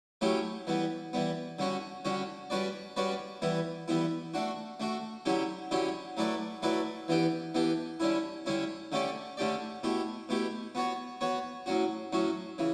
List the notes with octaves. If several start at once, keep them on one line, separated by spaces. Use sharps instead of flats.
F#3 A3 C#4 E4 G4
E3 G3 B3
E3 G3 B3
D3 G3 C#4 F#4
D3 G3 C#4 F#4
G3 C#4 F#4 B4 D5
G3 C#4 F#4 B4 D5
E3 G3 B3 E4
E3 G3 B3 E4
A3 D4 F#4
A3 D4 F#4
D3 F#3 C#4 E4 G4
D3 F#3 C#4 E4 G4
F#3 A3 E4 B4 D5
F#3 A3 E4 B4 D5
E3 B3 D4 G4
E3 B3 D4 G4
D3 G3 C#4 E4
D3 G3 C#4 E4
D3 A3 C#4 G4 D5
D3 A3 C#4 G4 D5
B2 A3 E4 G4
B2 A3 E4 G4
B3 F#4 C#5
B3 F#4 C#5
A2 F#3 C#4 F#4
A2 F#3 C#4 F#4
C#3 E3